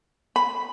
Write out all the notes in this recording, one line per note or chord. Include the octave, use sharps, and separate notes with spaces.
B5